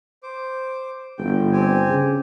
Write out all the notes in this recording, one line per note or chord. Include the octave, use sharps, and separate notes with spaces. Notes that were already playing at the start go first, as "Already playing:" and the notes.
C5 D6
G1 G5
C4 G4 G#5
C#3